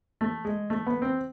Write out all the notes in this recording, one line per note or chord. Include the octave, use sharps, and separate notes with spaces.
A3
G#3
A3
B3
C4